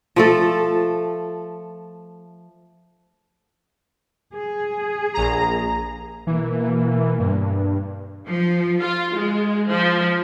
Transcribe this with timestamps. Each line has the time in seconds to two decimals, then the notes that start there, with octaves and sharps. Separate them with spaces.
0.16 F3 A3 A4
4.34 G#4
5.14 A#1 A#5
6.27 B2 E3 A#3
7.20 G2
8.28 F3
8.80 F4
9.14 G#3
9.66 F3